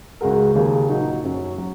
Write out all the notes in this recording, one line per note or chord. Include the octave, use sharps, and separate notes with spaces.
C#2 C#3 G#3 F#4 A#4
D#2 C#3 A#3
A#2 F#3 A#3 D#4 F#4
F#2 F#3 C#4
F#3